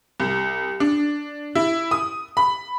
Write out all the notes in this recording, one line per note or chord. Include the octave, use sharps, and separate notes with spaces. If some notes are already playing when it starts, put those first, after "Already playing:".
C2
D4
E4
D#6
B5